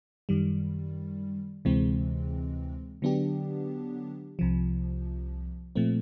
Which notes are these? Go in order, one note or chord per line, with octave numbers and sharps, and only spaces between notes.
F#2 D#3 G3
D2 C3 E3 G#3 C4
D3 F#3 B3 D4 G4
C2 C3 F3
A#2 F3 A3 C4